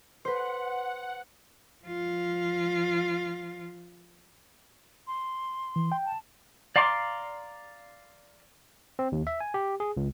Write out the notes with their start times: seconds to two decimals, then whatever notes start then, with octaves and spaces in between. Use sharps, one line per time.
0.25 B4 C5 F#5
1.84 F3 F4
5.07 C6
5.76 E3
5.92 G5
6.05 A5
6.76 D5 F5 A#5 C6 D6
8.99 C4
9.12 D#2
9.27 E5
9.41 G#5
9.54 G4
9.80 G#4
9.97 C#2